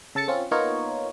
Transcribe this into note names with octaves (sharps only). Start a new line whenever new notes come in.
C#3 A4 A5 A6 C#7
C4 C#4 F4
A#3 B3 D#4 F4 A#4 C#5